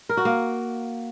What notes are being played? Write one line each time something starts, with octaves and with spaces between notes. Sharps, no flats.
A#4
F#4
A#3